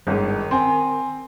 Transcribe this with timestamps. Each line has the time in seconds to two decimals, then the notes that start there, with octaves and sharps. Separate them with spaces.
0.07 G1 G#2 D#3
0.51 C4 G#5 C6